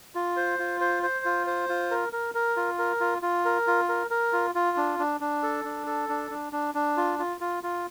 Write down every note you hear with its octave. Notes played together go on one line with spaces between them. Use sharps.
F4
C5
F4
C5
C5
F4
C5
F4
A#4
A#4
A#4
F4
A#4
F4
F4
A#4
F4
A#4
A#4
F4
F4
D4
D4
D4
A4
D4
A4
D4
D4
D4
D4
F4
F4
F4
F4